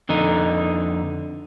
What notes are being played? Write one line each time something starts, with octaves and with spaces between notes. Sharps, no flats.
F2 D3 D#4